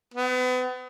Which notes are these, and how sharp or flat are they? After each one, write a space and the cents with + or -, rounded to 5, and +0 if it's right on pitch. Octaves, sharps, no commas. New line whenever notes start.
B3 +35